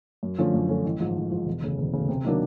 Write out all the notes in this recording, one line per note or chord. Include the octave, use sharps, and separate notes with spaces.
F#2
D3 F3 A3 C#4
F#2
D3 F3 A3 C#4
A1
G#2 F3
A1
G#2 F3
E1
D2 C#3
E1
D2 C#3
C3
D#3 F#3 A#3 D4